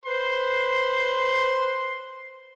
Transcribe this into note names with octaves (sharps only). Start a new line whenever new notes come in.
B4 C5 C6